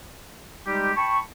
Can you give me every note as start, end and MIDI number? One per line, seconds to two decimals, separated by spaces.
0.66 0.91 55
0.66 0.91 56
0.66 0.91 63
0.66 0.91 67
0.97 1.18 79
0.97 1.18 81
0.97 1.18 83
0.97 1.18 85